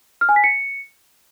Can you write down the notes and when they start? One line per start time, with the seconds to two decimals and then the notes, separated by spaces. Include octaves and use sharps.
0.21 F6
0.29 G#5
0.36 B6
0.44 C#7